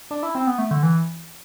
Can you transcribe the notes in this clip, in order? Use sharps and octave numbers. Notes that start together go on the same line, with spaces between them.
D4
E4
C4
B3
A3
D3
E3